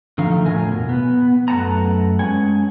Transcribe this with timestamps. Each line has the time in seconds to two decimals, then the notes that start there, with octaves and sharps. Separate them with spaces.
0.18 D3 D#3 F3 A3 F5 A#5
0.46 F2 A2 A#4 G#5
0.69 B2
0.89 B3
1.48 F#2 A3 B4 F#5 A5 A#5
2.19 G#3 C#4 F#5 G#5